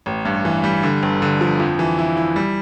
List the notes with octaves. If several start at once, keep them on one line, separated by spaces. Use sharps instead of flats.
A1
G2
E3
G3
D3
G1
D3
F3
F2
E3
E4
E4
G3